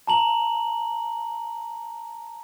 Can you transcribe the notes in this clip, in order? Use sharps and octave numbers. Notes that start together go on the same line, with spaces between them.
A5 A#5 F#7